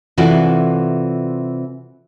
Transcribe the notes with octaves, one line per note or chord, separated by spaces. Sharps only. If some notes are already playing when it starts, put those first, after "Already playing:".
C3 E3 F4 F#4 A4 D5